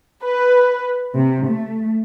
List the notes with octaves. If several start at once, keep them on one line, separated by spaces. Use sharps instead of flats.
B4
C3
A3